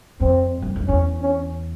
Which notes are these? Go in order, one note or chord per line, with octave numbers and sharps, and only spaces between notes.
F2 C4
F#2
F2
E2 C#4
C#4